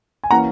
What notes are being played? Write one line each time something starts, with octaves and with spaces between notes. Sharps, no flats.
G#5
E3 A#3 C#4 F#5 A#5